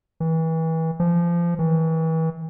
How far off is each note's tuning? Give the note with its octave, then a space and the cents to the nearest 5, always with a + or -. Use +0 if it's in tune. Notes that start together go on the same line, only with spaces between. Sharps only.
E3 -30
F3 -25
E3 -35